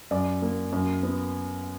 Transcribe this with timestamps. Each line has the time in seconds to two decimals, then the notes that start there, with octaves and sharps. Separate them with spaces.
0.11 F#2 D5
0.42 A#3
0.72 F#2
1.03 B3